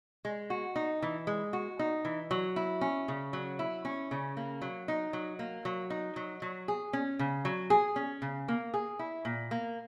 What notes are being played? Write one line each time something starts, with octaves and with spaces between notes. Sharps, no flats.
G#3
F#4
D#4
E3
G#3
F#4
D#4
E3
F#3
E4
C#4
C#3
F#3
E4
C#4
C#3
A#3
F#3
D#4
F#3
A#3
F#3
D#4
F#3
F#3
G#4
C#4
C#3
F#3
G#4
C#4
C#3
A#3
G#4
E4
A#2
A#3